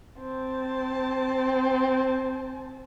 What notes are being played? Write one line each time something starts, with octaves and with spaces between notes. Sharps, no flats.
C4 A5